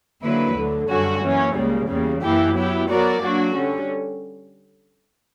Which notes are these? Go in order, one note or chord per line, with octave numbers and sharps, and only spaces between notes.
D3 F#3 A#3 E4 B4
D2 D3 F#3
F#2 D3 G3 C#4 F#4
F#2 E3 A#3 C#4
C#2 C#3 G3 A#3
E2 C#3 G3 A#3
F#2 E3 A#3 E4 G4
F#3 B3 E4 G4
F#3 B3 F#4 A#4 D5
F#3 A#3 D4 F#4
D3 G3 C#4